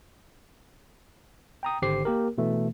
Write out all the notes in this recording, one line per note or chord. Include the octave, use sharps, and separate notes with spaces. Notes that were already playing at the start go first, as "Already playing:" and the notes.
G5 A#5 D#6
G#1 D3 G4 C5 D6 C7
A#3 G4 A#4
B2 E3 A3